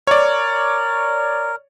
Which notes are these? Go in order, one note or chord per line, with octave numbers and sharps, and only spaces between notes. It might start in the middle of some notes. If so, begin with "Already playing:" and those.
A#4 C#5 D5